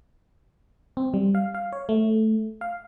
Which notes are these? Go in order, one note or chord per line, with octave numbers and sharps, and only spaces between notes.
C4
G3
F5
F5
C#5
A3
F5